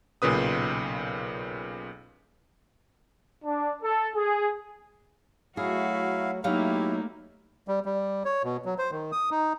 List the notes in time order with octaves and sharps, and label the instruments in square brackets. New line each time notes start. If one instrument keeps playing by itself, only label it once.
[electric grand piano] B1 A#2 C#3 B4 D#6
[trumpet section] D4
A4
G#4
[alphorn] F#3 [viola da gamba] A3 F#4 [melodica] E4 F5 [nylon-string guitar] G#4
[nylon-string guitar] F#3 D#4 F5 [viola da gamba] A3 A#3 [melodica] E4 [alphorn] G4
[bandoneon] G3
G3
C#5
B2
F#3
C5
D#3
D#6
D#4